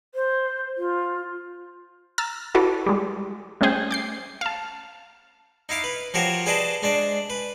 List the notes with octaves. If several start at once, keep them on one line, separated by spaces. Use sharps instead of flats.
C5
F4
A#5 E6 F6 A6
E4 F#4 A4 B4 C#5 D5
G3 G#3
G3 A3 C#4 G4 G#4 C5
D6 G6 C7
F5 A5
D#4 E4 F5 D6
B4
F3 F#4 G4 A#4 C5 C#5
G#4 B4 C5 D5 D#5 A5
G#3 D4 C5 D5
B4